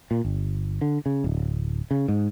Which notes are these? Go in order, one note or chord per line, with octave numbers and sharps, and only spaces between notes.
A#2
G1
D3
C#3
D1
C#3
G#2